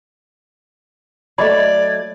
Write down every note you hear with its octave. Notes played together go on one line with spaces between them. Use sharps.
F#3 A3 D5 D#5 B5 G#6